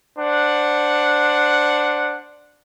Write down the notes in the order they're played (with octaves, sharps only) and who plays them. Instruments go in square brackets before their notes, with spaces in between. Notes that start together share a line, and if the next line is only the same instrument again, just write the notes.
[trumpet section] D4 C5 F#5